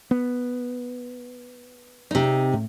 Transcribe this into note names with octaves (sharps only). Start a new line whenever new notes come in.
B3
C3 D#4
A2